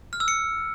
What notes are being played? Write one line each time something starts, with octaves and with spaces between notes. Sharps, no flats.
F6
E6
C#7